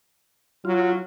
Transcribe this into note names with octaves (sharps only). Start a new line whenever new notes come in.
F#3 F4